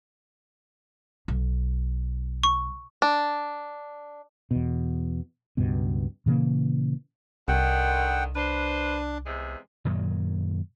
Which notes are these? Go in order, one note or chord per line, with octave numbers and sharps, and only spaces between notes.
B1
C#6
D4
E2 B2
C#2 G2 B2
A#2 C#3 E3 A#3
C2 D3 D#3 F#5 G5
D4 B4 C5
E2 C3 G#3
F#2 A#2 D#3 F#3